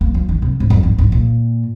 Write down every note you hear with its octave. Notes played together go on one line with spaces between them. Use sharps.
A#3
F3
D#3
C3
G#2
F2
G#2
G#2
A#2